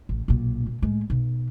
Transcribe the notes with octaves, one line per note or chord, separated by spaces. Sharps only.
A1
B1 A#2
A#2
A2 G#3
B1